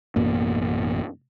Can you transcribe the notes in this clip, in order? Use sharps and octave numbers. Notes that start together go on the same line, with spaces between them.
A1 F#2 B2 A#3